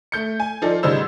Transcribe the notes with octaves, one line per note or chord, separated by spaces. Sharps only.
A3 G6 C#7
G#5
F3 D#4 F4 A4 D5
A1 C#3 G3 D#4 C5 E6